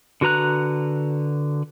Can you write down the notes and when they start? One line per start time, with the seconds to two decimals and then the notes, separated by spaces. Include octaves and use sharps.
0.21 D3 F#4 B4 A#5 F#6